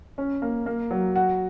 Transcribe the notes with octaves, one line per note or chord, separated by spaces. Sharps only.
C#4
A#3
A#3
F#3
F#4